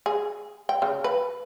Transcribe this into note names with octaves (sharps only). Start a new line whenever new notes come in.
G#4
G5
C#3
B4